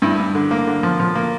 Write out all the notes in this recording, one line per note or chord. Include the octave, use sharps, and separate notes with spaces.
G2 E4
G2
D3
A#3
D3
F3
F3
A#3